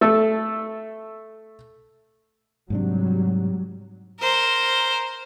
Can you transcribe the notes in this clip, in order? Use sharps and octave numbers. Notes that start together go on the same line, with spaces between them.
A3 A4
G#2 C3 F#3 G3 D4
A#4 C5